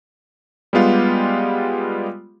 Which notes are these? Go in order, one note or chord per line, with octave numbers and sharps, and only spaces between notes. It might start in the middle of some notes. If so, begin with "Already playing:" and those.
G3 G#3 B3 F4 G4